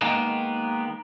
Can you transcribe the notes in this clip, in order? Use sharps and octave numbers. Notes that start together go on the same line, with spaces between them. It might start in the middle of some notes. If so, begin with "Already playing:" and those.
D#3 G#3 A#3 B3